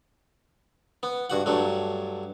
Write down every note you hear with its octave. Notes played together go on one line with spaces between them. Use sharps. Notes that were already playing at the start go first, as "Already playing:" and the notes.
B3
G2 F#4 F#5
G2 F#3 A3